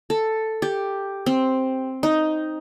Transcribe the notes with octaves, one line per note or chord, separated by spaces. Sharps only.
A4
G4
C4
D#4